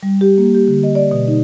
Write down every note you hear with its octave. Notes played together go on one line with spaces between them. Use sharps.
G3
G4
A#3
G4
D3
D#5
D5
B2
D#4